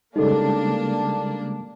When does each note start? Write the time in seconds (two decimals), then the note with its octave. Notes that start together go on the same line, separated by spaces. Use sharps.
0.16 C#3 G3 G#3 A#3 D4 D#4 A4